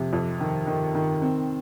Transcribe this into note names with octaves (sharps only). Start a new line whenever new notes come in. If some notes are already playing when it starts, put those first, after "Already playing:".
Already playing: F2 C3
F2
D#3
D#3
D#3
C4